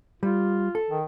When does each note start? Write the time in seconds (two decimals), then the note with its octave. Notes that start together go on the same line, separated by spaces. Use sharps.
0.23 G3 F4
0.75 A4
0.90 D#3